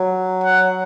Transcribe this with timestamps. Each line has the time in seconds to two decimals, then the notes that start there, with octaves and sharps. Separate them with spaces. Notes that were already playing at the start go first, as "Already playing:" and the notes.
Already playing: F#3
0.44 F#5